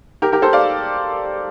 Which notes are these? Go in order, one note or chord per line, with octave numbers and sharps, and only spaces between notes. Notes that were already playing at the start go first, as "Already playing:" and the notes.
G4 A#4
G4 A#4
A4 C5
D5 F5